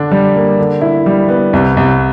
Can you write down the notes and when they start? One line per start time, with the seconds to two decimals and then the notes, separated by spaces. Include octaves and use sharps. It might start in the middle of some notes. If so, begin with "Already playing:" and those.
Already playing: D3 D4
0.11 G3
0.35 A#3
0.59 D3
0.81 E4
1.06 G3
1.28 B3
1.53 C2
1.77 C2